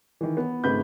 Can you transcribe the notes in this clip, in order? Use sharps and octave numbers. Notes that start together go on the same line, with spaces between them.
D#3 E3
B3
G#1 C#3 A3 B4 B5 G6